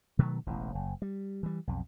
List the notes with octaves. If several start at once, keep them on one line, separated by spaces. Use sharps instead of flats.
B2 D#3 F#3 A3
E1 A1 E2
F#1
G3
E3 G3
B1 F2